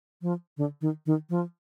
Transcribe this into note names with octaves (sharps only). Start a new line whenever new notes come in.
F3
D3
D#3
D#3
F3